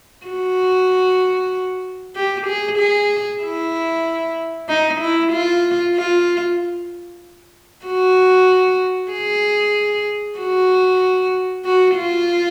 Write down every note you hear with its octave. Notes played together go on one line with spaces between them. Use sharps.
F#4
G4
G#4
G#4
E4
D#4
E4
F4
F4
F#4
G#4
F#4
F#4
F4